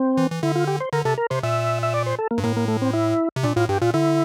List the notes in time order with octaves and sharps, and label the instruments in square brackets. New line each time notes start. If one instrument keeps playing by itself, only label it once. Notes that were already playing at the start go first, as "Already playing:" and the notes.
Already playing: [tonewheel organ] C4
[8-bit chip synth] E3
E3
[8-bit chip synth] D3 [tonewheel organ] E4
[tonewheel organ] F4
G4
C5
[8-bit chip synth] D3 [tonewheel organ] A#4
[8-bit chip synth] C3 [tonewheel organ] A4
[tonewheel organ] A#4
[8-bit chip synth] C3 [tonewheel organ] C5
[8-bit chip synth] A#2 [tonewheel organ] E5
[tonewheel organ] E5
D5
C5
A4
A#3
[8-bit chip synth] G2
[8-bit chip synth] A2 [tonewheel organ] A#3
[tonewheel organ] A#3
A3
C4
E4
[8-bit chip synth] C3
[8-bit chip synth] A#2 [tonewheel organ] D4
[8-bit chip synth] A2 [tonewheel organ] F4
[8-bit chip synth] G2 [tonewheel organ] G4
[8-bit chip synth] A#2 [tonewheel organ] F4
[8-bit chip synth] D3 [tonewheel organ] E4